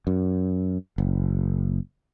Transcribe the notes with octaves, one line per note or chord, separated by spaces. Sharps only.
F#2
F#1